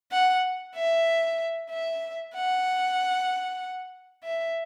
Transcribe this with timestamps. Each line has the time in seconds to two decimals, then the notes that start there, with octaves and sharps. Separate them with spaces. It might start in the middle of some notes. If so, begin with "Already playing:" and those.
0.12 F#5
0.75 E5
1.70 E5
2.34 F#5
4.24 E5